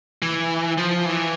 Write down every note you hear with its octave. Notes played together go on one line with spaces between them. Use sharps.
E3
F3
E3